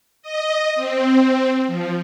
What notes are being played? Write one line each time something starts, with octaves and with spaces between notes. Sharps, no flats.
D#5
C4
F3